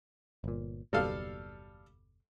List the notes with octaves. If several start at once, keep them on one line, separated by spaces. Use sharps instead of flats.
G1 A#2
F#1 D#2 B2 G3 A4 F5